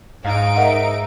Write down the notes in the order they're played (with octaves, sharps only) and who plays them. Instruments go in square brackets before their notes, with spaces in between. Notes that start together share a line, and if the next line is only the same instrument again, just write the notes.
[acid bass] G#2 [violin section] D#4 D7 [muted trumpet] F5
[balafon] A#4 D#5 F#5 [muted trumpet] E5